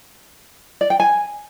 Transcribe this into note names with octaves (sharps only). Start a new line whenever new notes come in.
D5
G5
G#5